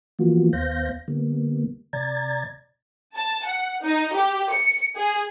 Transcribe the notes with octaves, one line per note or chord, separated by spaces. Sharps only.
E3 F3 A#3 B3 F4 F#4
D#2 B3 C5 F5 G6 A#6
D3 G3 A#3 B3
C3 D5 A#5 G#6 A6
A5
F#5
D#4
G4
C#7
G#4